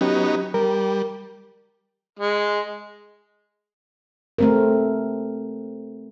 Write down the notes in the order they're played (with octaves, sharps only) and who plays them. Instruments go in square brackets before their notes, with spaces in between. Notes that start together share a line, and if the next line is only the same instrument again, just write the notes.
[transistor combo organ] F#3 B3 D#4 [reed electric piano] C#4 G4
[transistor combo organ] G3 [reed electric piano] A#4
[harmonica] G#3
[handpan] A3 C4 A#4